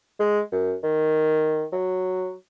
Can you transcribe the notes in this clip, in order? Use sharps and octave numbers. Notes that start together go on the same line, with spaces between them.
G#3
F#2
D#3
F#3